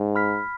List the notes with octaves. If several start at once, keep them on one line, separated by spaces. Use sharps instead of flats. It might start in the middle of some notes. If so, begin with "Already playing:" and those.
Already playing: G#2
B5 F6 B6